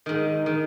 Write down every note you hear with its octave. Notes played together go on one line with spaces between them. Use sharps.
G#2 D#3
D#3